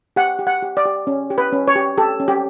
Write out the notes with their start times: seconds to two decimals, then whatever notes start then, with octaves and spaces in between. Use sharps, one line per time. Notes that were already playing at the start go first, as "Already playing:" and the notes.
0.16 G4 F#5
0.39 G4
0.47 F#5
0.62 G4
0.77 D5
0.85 G4
1.07 C#4
1.30 G4
1.38 B4
1.53 C#4
1.68 C#5
1.76 G4
1.98 G4 A4
2.20 C#4
2.28 G4